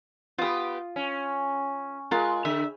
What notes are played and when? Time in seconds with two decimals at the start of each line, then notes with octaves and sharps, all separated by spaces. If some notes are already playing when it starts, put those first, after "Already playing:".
0.38 B3 F4 G4 D#6
0.96 C#4
2.11 G#3 F4 A#4
2.45 D3 E5